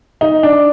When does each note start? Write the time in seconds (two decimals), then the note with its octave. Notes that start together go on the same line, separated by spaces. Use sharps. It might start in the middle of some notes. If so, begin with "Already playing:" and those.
0.21 D#4
0.43 D4